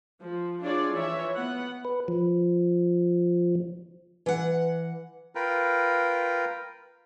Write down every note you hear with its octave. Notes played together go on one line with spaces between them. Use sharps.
F3
D4 E4 F4 G#4 C#5 D5
E3 F3 C#5 E5
B3 F#5
B4
F3
E3 F#5
F4 A#4 B4 G5